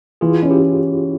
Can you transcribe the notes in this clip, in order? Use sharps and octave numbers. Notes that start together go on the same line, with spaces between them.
E3 F4 G#4
C#4
E4 G4